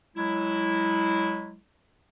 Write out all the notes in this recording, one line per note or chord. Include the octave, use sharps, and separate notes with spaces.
F#3 G#3 E4